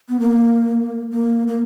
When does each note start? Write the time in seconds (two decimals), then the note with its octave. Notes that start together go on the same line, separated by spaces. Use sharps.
0.09 B3
0.20 A#3
1.11 A#3
1.48 A#3